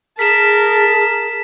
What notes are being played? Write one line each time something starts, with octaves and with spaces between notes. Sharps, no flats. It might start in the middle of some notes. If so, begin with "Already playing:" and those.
G#4 A#4 A5 B6 E7